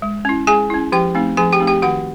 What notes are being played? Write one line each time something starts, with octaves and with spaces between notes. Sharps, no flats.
G#3
C#4 E4
G#3 G#4 G#5
C#4 E4
F3 G4 G5
A3 C4 D#4
F3 G#4 G#5
G4 G5
A3 C4 D#4
G4 G5
D#3 F#4 F#5